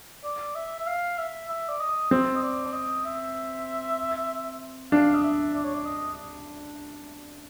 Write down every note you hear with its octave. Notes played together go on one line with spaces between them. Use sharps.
D5
E5
E5
F5
E5
E5
D5
D#5
C4
D#5
D5
D5
D#5
E5
D4 F5
D#5
E5
D5
C#5
D5
D#5